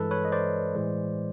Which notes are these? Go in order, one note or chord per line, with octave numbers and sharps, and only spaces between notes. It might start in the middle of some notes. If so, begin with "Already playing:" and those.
Already playing: G2 E3 G#3 A4 B4
B4 C#5
D#5
C5 D5
A2 E3 G#3